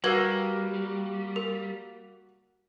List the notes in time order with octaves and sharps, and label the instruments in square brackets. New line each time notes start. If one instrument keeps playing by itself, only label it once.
[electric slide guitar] G3 [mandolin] A#3 [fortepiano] F#4 E6 [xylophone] B4 G#6 G7
[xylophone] A#4